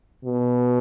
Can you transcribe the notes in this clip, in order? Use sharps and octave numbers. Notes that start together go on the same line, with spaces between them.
B2